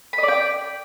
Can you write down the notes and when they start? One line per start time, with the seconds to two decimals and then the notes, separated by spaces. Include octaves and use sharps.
0.13 B5
0.18 D#5
0.23 D5
0.28 G5